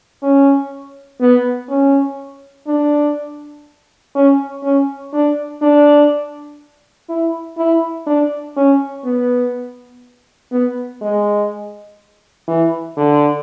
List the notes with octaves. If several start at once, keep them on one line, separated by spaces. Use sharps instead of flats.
C#4
B3
C#4
D4
C#4
C#4
D4
D4
E4
E4
D4
C#4
B3
B3
G#3
E3
D3